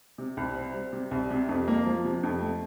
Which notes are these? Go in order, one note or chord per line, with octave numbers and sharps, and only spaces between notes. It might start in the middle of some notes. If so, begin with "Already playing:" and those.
C3
C2
C4
G3
C3
C2
C3
F2
A#3
F3
C3
F2
A3